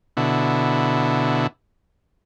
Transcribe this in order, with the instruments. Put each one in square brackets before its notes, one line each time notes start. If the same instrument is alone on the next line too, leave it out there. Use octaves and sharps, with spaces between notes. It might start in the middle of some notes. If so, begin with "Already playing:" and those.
[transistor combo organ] B2 D3 E4